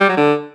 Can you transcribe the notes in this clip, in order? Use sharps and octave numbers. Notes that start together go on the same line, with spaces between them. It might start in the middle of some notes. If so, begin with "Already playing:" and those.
G3
F#3
D3